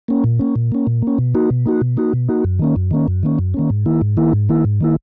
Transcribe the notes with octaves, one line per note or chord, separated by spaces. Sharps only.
A#3 C#4
A#2
A#3 C#4
A#2
A#3 C#4
A#2
A#3 C#4
B2
A#3 D#4 F#4
B2
A#3 D#4 F#4
B2
A#3 D#4 F#4
B2
A#3 D#4 F#4
F#2
D#3 A#3 C#4
F#2
D#3 A#3 C#4
F#2
D#3 A#3 C#4
F#2
D#3 A#3 C#4
G#2
D#3 A#3 E4
G#2
D#3 A#3 E4
G#2
D#3 A#3 E4
G#2
D#3 A#3 E4